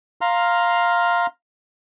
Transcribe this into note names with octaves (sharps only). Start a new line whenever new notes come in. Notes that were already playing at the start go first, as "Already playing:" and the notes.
F5 A#5 C6 F6